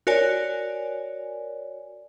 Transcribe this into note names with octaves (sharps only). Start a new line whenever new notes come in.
F#4 A#4 C#5 D5 G#5